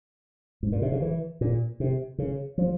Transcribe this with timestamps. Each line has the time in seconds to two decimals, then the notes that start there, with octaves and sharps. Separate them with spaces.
0.63 G#2
0.72 A#2
0.82 C3
0.92 C#3
1.02 E3
1.41 A#2
1.80 C3
2.18 C#3
2.58 F3